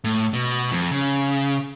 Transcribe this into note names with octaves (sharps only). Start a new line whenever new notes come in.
A2
B2
F2
C#3